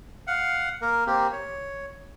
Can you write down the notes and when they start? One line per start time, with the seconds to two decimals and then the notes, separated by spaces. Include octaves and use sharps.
0.27 F5 F#5
0.82 A#3 A#4
1.07 A#3 C4 G4
1.32 C#5